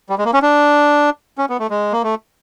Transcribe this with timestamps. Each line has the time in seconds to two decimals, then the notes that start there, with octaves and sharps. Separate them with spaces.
0.10 G3
0.18 G#3
0.25 A#3
0.33 C#4
0.42 D4
1.38 C#4
1.50 B3
1.59 A3
1.70 G#3
1.92 A#3
2.04 A3